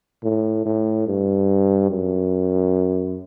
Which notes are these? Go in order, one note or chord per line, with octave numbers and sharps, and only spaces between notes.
A2
A2
G2
F#2